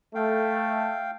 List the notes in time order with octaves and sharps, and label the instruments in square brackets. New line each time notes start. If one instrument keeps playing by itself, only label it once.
[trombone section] A3 [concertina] F5 G5